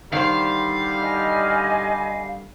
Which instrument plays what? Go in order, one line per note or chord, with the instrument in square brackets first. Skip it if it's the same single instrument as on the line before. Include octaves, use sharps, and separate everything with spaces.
[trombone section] D3 G3 [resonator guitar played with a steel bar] D#3 C5 [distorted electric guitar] F5
[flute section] D#5 G#5